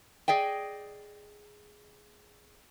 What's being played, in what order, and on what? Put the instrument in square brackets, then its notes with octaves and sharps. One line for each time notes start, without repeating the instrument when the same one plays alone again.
[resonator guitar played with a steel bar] G#4 D5 D#5 G5